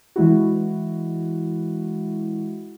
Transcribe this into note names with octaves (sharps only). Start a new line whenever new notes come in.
E3 G#3 E4 F#4